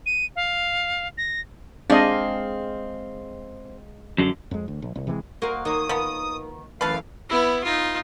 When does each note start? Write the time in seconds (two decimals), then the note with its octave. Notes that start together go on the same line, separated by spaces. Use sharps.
0.06 D#7
0.36 F5
1.18 A#6
1.90 G#3 C4 D4 G#4 D#5 F5
4.18 F#2 D3
4.51 F2 G#3
4.68 D2
4.82 A#1
4.95 C2
5.07 C3 E3 G3 G#3
5.42 A#3 F#4 A#4 C5 D#5
5.65 D#3 A#3 C#5 D#6
5.89 D#3 F3 B3
6.81 F#2 E3 A3 B4 F5 A5
7.29 B3 E4
7.63 D#4 F4